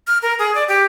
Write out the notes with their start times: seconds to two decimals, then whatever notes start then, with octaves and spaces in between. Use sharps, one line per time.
0.07 F6
0.22 A#4
0.39 G#4
0.55 D5
0.68 G4